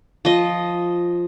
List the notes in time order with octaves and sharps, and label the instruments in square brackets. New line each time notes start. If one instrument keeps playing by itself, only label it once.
[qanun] F3 D#5